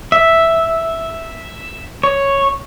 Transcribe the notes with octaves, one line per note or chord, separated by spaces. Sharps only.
E5
C#5